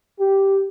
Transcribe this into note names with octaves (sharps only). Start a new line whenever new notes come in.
G4